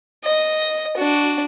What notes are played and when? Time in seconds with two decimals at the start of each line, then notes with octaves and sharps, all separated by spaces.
0.24 D#5
0.97 D4 F#4